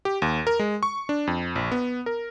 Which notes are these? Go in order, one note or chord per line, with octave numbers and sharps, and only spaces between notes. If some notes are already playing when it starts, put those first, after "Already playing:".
G4
D#2
A#4
G#3
C#6
D4
F2
A#1
B3
A#4